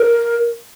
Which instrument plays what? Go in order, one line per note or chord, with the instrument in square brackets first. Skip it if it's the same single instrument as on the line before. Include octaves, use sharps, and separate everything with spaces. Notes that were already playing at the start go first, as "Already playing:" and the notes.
Already playing: [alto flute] A#4